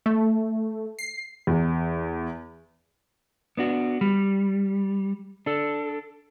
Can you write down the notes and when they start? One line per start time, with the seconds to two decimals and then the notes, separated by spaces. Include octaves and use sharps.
0.06 A3
0.99 C7
1.47 E2
3.57 B3 D4 F#4
4.01 G3
5.46 D4 A4